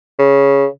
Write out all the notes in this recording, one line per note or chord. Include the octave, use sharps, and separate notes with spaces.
C#3